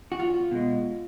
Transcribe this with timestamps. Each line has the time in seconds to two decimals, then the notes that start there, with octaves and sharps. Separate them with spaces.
0.12 F#4
0.19 E2 F4
0.51 B2 G#3